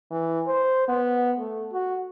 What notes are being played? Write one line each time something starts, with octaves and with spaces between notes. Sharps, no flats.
E3
C5
B3
A3
F#4